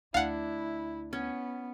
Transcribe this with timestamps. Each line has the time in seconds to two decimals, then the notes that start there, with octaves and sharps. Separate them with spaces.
0.14 D2 D4 E4 F5 F#5
1.13 B3 C#4